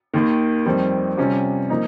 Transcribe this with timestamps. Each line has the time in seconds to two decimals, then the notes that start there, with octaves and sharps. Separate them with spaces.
0.14 D#2 D#3 A#3
0.66 F2 D#3 G3 C4
1.17 C3 G3 C#4 F4
1.70 F3 A#3 D#4